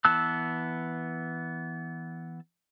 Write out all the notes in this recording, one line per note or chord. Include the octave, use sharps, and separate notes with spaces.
E3 B3 A5 E6 F#6